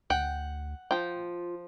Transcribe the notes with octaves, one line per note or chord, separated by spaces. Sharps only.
D2 F#5 G5
F3 F4 G5